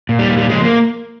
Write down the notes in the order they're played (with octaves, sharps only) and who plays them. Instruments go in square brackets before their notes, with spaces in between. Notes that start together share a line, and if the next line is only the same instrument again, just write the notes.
[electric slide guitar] A#2
G3
A#2
G3
F3 G#3
A#3